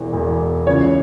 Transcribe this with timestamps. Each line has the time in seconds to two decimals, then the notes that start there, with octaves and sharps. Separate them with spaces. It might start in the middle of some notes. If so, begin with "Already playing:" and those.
Already playing: E1 E2 E3
0.13 E1 E2 E3
0.66 C#2 C#3 E3 C#5